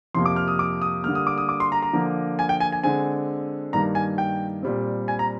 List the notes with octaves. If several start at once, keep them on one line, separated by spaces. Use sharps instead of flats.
F2 C3 F3 A#3 C6
D6
F6
D#6
D6
D#6
D3 G3 A#3 F6
D#6
D6
D#6
D6
C6
A#5
A#5
D3 F3 A#3
G#5
G5
G#5
G#5
D3 G#3 C4 G#5
G2 D#3 A#3 A#5
G#5
G5
A#2 G3 C4
G#5
A#5